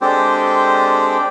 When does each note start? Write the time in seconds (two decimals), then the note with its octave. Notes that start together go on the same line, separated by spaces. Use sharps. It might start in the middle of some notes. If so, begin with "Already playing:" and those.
0.01 G#3 C4 D4 G4 A4 C5